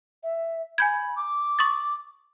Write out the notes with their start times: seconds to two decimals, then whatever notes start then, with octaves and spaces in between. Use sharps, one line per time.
0.23 E5
0.78 G#5 B5 G6 G#6
1.16 D6
1.59 C#6 D#6 A6